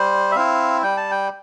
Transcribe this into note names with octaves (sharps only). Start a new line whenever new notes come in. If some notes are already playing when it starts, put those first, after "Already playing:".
Already playing: G3 C5
E5
C4 E4 F5
G3 G5
A5
G5